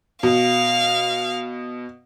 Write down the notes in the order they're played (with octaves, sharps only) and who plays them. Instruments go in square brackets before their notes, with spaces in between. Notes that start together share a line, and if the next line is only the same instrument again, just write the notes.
[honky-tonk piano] B2 [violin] F5